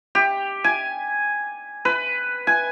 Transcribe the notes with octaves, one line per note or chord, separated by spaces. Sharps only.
G4
G#5
B4
G#5